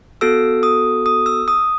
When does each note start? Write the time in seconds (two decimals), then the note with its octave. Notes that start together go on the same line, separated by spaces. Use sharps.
0.21 B3 F#4 A4 E6
0.63 D#6
1.06 D#6
1.26 E6
1.48 D#6